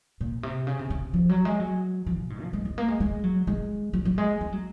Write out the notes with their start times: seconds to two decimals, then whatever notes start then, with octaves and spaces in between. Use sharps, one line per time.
0.21 A#2
0.43 C3
0.67 C#3
0.79 C3
0.90 C#3
1.13 F3
1.29 F#3
1.45 G#3
1.60 F#3
2.06 F3
2.19 A#2
2.30 G#2
2.42 F3
2.53 G#3
2.65 G#3
2.78 A#3
2.88 G#3
3.00 G#3
3.24 F#3
3.47 G#3
3.93 F#3
4.05 F#3
4.18 G#3
4.41 G#3
4.53 F#3